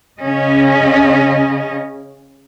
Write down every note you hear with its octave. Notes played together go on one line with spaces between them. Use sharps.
C#3 C#4 D#5